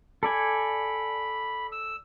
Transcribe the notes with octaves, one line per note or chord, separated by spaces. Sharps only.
A4 D5 G#5 B5
E6